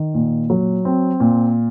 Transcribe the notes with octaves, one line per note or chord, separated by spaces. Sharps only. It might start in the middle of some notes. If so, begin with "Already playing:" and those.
Already playing: D#3
A#2
F#3
C4
A#2